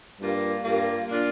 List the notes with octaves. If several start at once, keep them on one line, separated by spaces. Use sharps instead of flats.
G2 G3 A#3 F4
G2 G3 A#3 F4
A#2 A#3 D4 F4